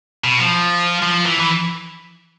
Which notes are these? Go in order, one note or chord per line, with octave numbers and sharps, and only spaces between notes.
B2
F3
F3
E3
E3